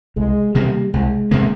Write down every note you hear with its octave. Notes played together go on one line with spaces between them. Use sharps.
C2 G#3
C3 D#3 G3 A#3
C2 G#3
C3 D#3 A#3